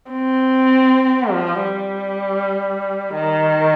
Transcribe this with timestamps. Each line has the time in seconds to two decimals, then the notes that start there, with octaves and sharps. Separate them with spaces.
0.11 C4
1.33 F3
1.63 G3
3.14 D#3